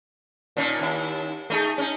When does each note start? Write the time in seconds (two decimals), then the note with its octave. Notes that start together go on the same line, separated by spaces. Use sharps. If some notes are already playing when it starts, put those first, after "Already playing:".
0.57 A#2 C#4 D#4
0.79 D#2 E4
1.50 A3 D#4 G#4
1.78 C#4 D#4